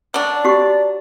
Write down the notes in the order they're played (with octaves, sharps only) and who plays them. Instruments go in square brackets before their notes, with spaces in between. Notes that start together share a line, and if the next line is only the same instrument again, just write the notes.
[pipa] F#3 D4 [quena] D5
[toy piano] F#4 G4 C#6